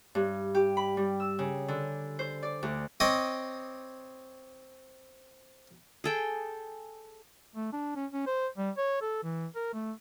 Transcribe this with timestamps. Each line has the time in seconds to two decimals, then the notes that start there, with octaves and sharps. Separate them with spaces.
0.15 G2
0.55 G4
0.77 B5
0.97 G3
1.20 E6
1.39 C#3
1.68 D3
2.19 C5
2.43 D5
2.63 D2
3.00 C4 C#5 D#5 D6 D#6
6.04 G#4 A4 G5
7.56 A3
7.73 D4
7.96 C#4
8.13 C#4
8.27 C5
8.58 G3
8.78 C#5
9.02 A4
9.24 E3
9.56 A#4
9.74 A3